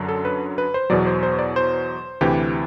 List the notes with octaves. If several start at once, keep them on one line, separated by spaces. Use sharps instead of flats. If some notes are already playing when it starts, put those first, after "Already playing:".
Already playing: F#2 D3 F#3
A4
B4
B4
C5
E2 B2 F#3 D5
C5
C5
D5
C5
D2 C3 E3 G4